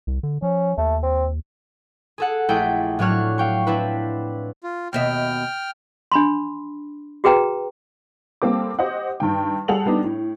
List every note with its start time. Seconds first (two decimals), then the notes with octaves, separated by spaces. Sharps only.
0.07 C2
0.23 D3
0.42 F3 C#4
0.78 D#2 A3
1.03 C4
2.18 G#4 A4 F#5
2.49 A#1 A3 E4 G#4 G5 G6
2.99 A2 F#3 D4 C#5 F6 F#6
3.38 F5 G5 C#6
3.67 C4 D4 E4 B4
4.63 F4
4.93 D#2 B2 E5 G5 F6
6.12 D4 B5 C6
7.24 F#4 G#4 B4 G5 A#5
8.42 G3 A#3 C4 A4 D6
8.79 G4 C5 D#5 F#5
9.20 G2 D#3 G5
9.68 G3 G#4 A4 F#5 F7 F#7
9.86 G3 B3 D4 D#4
10.04 A2